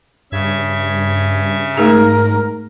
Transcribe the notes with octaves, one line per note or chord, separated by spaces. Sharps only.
G2 C#3 E5 G#6
G#2 A3 D#4 G#4 A#4